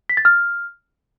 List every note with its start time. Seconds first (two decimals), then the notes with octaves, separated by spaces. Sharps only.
0.09 B6
0.17 A6
0.25 F6